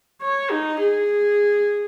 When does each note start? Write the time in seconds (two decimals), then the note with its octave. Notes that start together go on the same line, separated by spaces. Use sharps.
0.22 C#5
0.51 D#4
0.80 G#4